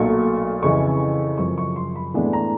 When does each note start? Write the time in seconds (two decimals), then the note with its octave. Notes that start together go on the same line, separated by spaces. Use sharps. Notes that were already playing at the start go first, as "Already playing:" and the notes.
Already playing: B1 A#2 F#3 A3 C#6
0.63 F2 C#3 E3 C#6
1.38 F#2 C#3 F3 C#6
1.58 C#6
1.76 C6
1.96 B5
2.14 A2 E3 G#3 B3 D4
2.33 A#5